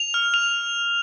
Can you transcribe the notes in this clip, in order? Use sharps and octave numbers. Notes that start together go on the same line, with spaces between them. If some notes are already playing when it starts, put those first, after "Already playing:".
Already playing: F7
F6
F7